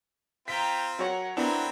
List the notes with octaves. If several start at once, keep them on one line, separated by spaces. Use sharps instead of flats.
C4 F4 G5 A#5 B6
F#3 A#4 C#5 F#5
F#3 B3 C4 D4 E4 A#4 B5